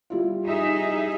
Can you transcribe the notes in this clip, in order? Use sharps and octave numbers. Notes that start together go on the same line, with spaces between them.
G3 E4 F4
D#4 G#4 E5